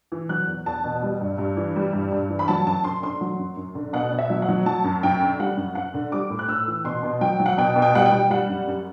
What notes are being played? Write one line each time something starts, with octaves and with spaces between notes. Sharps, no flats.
E3
F#3 F#6
E2
E2 A5
B2
G3
G2
G2
E3
G3
G2
G2
E3
B5
F#3 A5
F#2 A5
F#2 C6
D3 C6
F#3 C6
F#2
F#2
D3
B2 F#5
B2
E5
F#3
F#5
F#3
F#3 A5
F#2
F#2 G5
D3
G3 F#5
F#2
F#2 F#5
D3
G3 D6
A2
F#6
A2 E6
E3
B2 C6
B2
F#3 G5
F#3
F#5
B2 G5
B2
G5
G3 F#5
G5
G3
G3 F#5
F#2
F#2